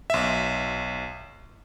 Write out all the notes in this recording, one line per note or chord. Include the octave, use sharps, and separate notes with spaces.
B1 E5